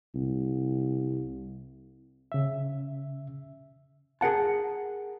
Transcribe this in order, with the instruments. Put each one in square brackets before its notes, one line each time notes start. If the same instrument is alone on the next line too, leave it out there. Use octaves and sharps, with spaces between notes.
[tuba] C2
[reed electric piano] C#3 E5
[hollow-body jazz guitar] G#4 A#4 F#5 A5